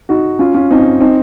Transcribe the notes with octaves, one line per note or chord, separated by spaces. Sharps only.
D#4 F#4
C#4 F4
C#4 F4
C4 D#4
C4 D#4